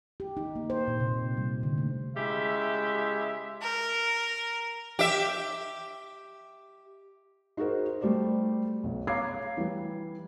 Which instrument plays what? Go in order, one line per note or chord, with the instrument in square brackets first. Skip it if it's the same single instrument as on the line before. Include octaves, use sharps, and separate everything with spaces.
[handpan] G4
D#4
A#3
C5
A#2
C3
G3
D3
A3
[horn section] C#3 G#3 E4 G4 E5
[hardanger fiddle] A#4
[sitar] G4 E5
[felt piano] D#4 F#4 G#4 A#4 C5
G3 A3 G4 C5 D5
B1
C#5 F5 A#5 D6 G#6 C7
E3 G3